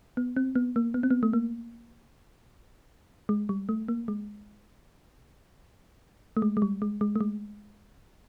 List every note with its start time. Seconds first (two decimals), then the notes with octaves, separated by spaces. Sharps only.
0.17 B3
0.36 C4
0.56 B3
0.76 A#3
0.94 B3
1.03 C4
1.11 B3
1.23 A3
1.33 A#3
3.29 G#3
3.49 G3
3.69 A3
3.88 A#3
4.08 G#3
6.37 A3
6.42 G#3
6.57 G#3
6.62 G3
6.82 G#3
7.01 G#3
7.16 A3
7.21 G#3